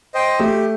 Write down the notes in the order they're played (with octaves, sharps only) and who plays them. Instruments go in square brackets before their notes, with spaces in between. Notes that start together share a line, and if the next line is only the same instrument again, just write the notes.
[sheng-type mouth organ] C5 D#5 G5
[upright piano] A3 [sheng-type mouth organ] G4